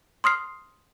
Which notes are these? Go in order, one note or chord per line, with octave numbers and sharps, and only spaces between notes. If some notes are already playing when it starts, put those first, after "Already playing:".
C6 D#6 F6 C7